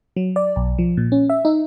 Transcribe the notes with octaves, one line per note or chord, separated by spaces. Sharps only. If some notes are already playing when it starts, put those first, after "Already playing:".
F#3
D5
B1
F3
A#2
C#4
E5
D#4